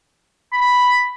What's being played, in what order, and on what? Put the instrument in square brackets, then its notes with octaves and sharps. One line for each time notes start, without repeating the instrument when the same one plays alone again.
[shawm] B5